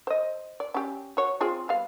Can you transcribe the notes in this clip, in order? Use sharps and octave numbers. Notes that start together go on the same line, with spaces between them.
C5 D#5
D5
C#4 G4
F#4 C#5
C4 F4 G#4
G3 B3 F5